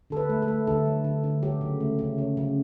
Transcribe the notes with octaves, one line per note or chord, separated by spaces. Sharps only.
D3 A4
B4
A3
A4
A3
D3 A4
F#3
D3
D3
F#3 G4
C#3
A3
C#3
F#3
C#3